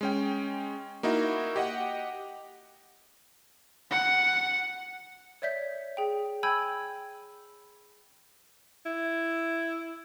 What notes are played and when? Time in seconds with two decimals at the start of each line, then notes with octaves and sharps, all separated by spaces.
0.01 G#3 C#4 G5
1.03 A#3 D#4 E4 F#4
1.56 G4 D#5 F#5
3.91 F#5
5.42 C#5 D5 E5 G6 B6
5.97 G#4 G5
6.43 G5 G#5 B5 E6 G6 G#6
8.86 E4